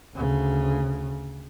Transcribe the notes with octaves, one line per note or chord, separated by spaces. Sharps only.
D2 C#3